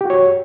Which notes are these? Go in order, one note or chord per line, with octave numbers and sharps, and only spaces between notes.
F#4 G4 C#5